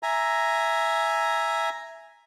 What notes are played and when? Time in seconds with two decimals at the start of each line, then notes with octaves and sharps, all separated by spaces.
0.03 E5 G#5 A#5